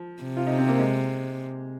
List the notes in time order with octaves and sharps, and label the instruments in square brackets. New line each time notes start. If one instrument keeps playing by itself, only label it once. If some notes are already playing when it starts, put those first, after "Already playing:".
Already playing: [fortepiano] F3
[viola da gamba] C3
[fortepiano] F4
D#4
C4
A#3
G#3